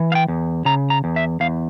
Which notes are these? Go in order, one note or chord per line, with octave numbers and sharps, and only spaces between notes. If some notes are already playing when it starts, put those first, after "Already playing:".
Already playing: E3
F5
G5
E2
C#3 A#5
A#5
E2
E5
E2 F5